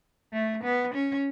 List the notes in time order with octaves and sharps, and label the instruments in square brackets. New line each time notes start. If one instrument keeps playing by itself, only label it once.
[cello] A3
B3
C#4